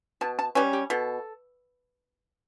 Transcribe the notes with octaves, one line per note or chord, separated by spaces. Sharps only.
B2 A5
A5
G3 C#4 B4
G4
B2 A4